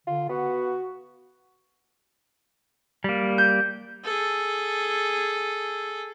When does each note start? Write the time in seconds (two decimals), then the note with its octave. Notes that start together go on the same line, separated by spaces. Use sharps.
0.07 D3 F4
0.29 B3 F#4
3.04 G3 A#3
3.38 G6
4.04 G#4 A4